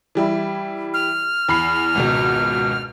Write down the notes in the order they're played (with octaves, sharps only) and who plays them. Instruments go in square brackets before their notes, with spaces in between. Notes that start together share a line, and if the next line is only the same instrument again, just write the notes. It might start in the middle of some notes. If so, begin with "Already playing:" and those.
[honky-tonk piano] E3 G3 E4
[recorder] F6
[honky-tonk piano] E2 B5 C7
G#1 C#2 B2